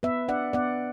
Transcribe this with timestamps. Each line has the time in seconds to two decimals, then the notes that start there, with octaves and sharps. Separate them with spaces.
0.03 B3 B4 E5
0.28 D4 D5 F#5
0.53 B3 D5 F#5